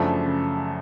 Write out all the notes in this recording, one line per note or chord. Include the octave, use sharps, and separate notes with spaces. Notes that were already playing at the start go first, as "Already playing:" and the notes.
Already playing: F#2 C#3 F3 A3 D4
C#3